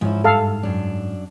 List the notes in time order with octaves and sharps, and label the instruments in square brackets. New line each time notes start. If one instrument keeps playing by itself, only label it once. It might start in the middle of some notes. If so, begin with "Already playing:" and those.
[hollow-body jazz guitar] G#2 [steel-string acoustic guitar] F3 C#4 E4
[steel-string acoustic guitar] G2 [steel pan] A4 F5
[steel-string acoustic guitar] F#2 D4